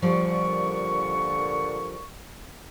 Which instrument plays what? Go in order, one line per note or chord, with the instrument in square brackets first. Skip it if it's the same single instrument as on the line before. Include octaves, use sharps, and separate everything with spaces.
[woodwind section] A#2 D3 C#6 [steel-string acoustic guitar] F3 G3